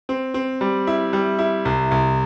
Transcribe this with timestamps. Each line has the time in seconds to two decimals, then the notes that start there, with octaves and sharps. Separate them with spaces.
0.09 C4
0.34 C4
0.61 G3
0.87 E4
1.13 G3
1.39 E4
1.65 C2
1.91 C2